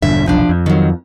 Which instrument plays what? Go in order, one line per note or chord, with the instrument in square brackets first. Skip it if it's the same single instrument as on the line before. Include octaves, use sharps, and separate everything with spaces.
[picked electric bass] E1 G2 D3 [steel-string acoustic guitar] E5
[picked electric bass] F1 B1 [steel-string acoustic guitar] C3 F3 D4
[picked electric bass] F2
[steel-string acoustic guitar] D#3 F#3